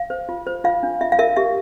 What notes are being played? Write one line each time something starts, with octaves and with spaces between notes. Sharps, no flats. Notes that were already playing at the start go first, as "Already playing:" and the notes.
Already playing: F5
C5
F4
C5
F4 F5
D4
F4 E5
F5
A#4 E5
G4 E5